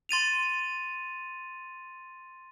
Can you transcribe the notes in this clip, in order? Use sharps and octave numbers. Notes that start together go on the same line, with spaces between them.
C6 A6 D#7 F7